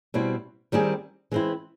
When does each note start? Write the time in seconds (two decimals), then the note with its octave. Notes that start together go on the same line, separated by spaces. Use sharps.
0.14 B2 G3 C4 E4
0.72 D#3 G3 C4 E4 G#4
1.32 E3 G#3 C4 E4